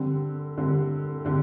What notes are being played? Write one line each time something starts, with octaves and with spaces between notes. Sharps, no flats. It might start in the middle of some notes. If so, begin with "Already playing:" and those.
Already playing: D3 G3 C4
D3 G3 C4
D3 G3 C4